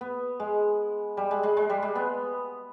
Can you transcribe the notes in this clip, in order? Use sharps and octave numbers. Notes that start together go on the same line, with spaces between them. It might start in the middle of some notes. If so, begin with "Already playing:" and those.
B3
G#3
G3
G#3
G#3
G#3
G3
G#3
B3